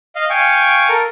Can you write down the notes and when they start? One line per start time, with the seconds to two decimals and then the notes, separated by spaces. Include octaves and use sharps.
0.15 D#5 F5
0.30 F5 G5 G#5 C#6
0.89 A4 A#4